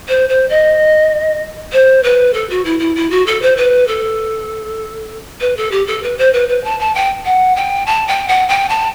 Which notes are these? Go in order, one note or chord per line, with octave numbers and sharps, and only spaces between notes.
C5
C5
D#5
C5
B4
A4
F#4
E4
E4
E4
F#4
A4
C5
B4
A4
B4
A4
G4
A4
B4
C5
B4
B4
A5
A5
G5
F#5
G5
A5
G5
F#5
G5
A5